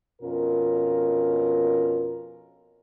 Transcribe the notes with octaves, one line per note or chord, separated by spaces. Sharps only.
F2 B2 C#4 F4 A#4